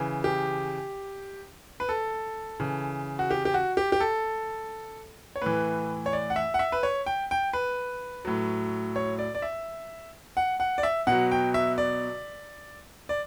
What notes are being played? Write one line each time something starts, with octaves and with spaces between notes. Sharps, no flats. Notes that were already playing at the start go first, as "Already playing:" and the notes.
Already playing: C#3 E3
G4
B4
A4
C#3 E3
F#4
G4
G4
F#4
G4
G4
A4
C#5
A2 E3 B4
C#5
D5
F#5
E5
F#5
E5
B4
C#5
G5
G5
B4
A2 F#3
C#5
D5
D5
E5
F#5
F#5
D5
E5
B2 F#3 F#5
G5
E5
D5
D5